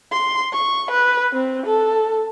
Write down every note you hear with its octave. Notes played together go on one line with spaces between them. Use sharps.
C6
C#6
B4
C4
A4